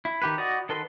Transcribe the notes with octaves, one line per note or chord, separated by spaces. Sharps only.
E4
D#3 G4 B4
F#4 D5 D#5
D#3 A4 B4 C6